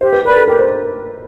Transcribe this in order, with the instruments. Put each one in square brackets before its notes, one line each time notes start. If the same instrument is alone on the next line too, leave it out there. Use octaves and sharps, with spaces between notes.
[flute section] G4 [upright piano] C5
[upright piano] B4
[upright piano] A#4 [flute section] B4 D5
[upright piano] A4
[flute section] G4 [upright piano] A#4
[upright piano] C5